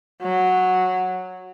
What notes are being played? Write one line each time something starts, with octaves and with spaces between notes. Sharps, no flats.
F#3